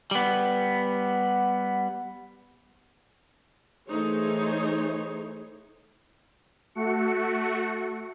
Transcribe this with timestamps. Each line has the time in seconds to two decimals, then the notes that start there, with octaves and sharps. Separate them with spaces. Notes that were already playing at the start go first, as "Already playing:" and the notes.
0.11 G3 B3
3.88 E3 A3 D#4 G#4 C5 C#5
6.75 A3 F#4 C#7